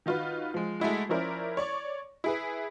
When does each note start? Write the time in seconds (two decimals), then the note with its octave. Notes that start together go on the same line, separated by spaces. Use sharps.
0.06 D#3 D#4 F4 F#4 B4
0.54 F3 G#3
0.80 G#3 A3 E4 F#4
1.09 F3 C#4 E4 A#4 C5 D5
1.57 C#5 D5 C#6
2.24 E4 G#4 B4